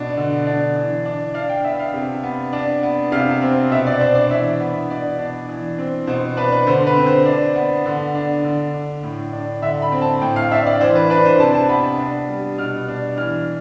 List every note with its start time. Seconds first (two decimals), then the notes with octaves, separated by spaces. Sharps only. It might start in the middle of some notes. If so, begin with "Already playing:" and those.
Already playing: B2 D4
0.17 D3
0.47 D4
0.75 E3
1.05 D4
1.34 D4 F5
1.49 G5
1.64 B3 E5
1.80 F5
1.94 C3
2.23 B3
2.53 D4
2.83 B3
3.12 C3 F5
3.42 C4
3.71 B2 E5
3.86 D5
4.01 D4 C5
4.15 D5
4.30 E3 E5
4.60 B3
4.90 B2 D5
5.18 D4
5.49 E3
5.78 C4
6.07 B2 C5
6.37 D4 B4
6.52 B4
6.67 D3 C5
6.87 B4
6.97 C4
7.06 C5
7.26 D4
7.56 B3
7.86 D3
8.15 D4
8.44 D3
8.74 D4
9.03 A2
9.33 D4
9.62 D3 E5
9.82 B5
9.92 C4
10.02 A5
10.21 A2 G5
10.36 F5
10.51 D4 E5
10.66 D5
10.81 E3 C5
10.96 B4
11.10 D4 B4
11.25 C5
11.40 C3 A5
11.55 A5
11.69 B3 B5
11.99 D4
12.28 G3
12.58 B2 F6
12.88 D4
13.17 E3 F6